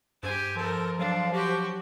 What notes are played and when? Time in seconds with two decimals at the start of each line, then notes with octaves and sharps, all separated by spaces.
0.23 G2 G4 C5 G#5
0.56 F3 A4 A#4
0.99 F#3 D4 F5
1.33 F#4 G4 G5